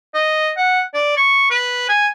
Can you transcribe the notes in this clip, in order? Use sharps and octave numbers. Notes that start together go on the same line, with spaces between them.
D#5
F#5
D5
C#6
B4
G#5